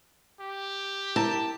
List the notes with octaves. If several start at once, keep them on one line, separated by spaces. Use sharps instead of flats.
G4
E4 A#4 A5 A#5